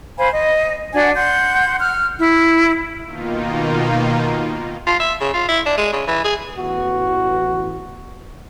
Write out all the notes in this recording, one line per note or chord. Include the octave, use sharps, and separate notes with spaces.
C5 F5 G#5 B5
D#5
D4 F#4 F#5 G#5
F#5 C6 G6
F6 F#6
E4
B2 D#3 A#3 D#4 F4
F4
E5
C#3
F4
E4
D4
G#3
C#3
E3
G#4
A1 E3 B3 F#4